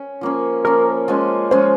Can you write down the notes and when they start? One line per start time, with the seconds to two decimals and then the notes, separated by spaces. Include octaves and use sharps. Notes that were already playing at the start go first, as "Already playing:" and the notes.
Already playing: C#4
0.21 F3 A#3 C#4
0.65 F3 A#3 C#4 A#4
1.08 F3 G#3 C#4
1.51 F3 G#3 C#4 C5